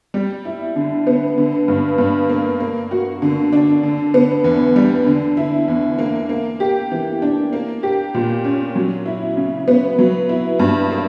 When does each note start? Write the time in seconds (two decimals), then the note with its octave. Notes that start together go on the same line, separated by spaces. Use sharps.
0.14 G3
0.45 E4
0.76 D3
1.07 B3
1.38 D3
1.68 G2
1.98 G2
2.29 A#3
2.60 A#3
2.91 F#4
3.22 D3
3.53 D4
3.83 D3
4.14 B3
4.44 E2
4.76 G3
5.06 D3
5.37 E4
5.68 E2
5.99 A#3
6.29 A#3
6.60 G4
6.91 E3
7.22 D4
7.53 A#3
7.83 G4
8.14 A#2
8.44 C#4
8.75 F#3
9.06 E4
9.37 C#3
9.68 B3
9.99 F#3
10.29 E4
10.59 G2
10.91 A#3